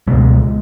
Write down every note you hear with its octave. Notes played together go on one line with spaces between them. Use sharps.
C#2 B2 G#3